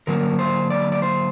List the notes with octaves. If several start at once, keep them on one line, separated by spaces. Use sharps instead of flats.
D3 F#3 A#3 A#4
C5
D5
D5
C5